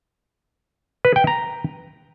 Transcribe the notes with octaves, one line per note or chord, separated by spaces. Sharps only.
B4
G5
A#5